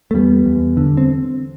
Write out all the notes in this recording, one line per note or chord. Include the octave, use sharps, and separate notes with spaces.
A3
E2 G3 B3
E2
D3
C4